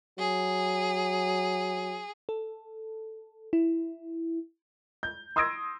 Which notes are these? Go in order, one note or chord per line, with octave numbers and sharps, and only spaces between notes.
F#3 G#4
A4
E4
G6
C6 D#6 E6 G#6 A#6 D7